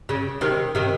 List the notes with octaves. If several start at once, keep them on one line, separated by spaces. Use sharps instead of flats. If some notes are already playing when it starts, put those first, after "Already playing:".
C#3
C3 D#3
C3 D#3